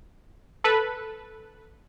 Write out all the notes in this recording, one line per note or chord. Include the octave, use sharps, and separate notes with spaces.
A4 B4